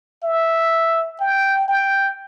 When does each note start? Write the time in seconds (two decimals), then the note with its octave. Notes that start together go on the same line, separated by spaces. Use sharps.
0.24 E5
1.20 G5
1.68 G5